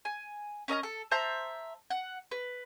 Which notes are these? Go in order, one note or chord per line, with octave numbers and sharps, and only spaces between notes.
G#5
C#4 A#4 D#5 A#5
A4
C5 E5 A5 A#5
F#5
B4